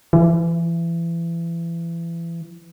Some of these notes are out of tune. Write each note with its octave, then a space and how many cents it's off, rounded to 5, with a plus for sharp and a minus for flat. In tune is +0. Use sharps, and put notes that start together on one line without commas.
E3 +30